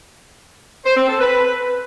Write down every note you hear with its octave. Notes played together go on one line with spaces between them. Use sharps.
C5
C4
A4
B4